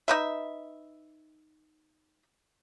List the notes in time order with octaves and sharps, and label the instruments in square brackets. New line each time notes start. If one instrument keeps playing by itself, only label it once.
[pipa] D#4 B4 E5